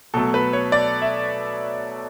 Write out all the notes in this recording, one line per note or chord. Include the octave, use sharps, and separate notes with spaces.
B2 F#3 A3 A4
B4
C#5
D5
E5